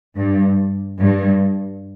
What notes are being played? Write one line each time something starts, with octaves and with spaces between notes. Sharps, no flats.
G2
G2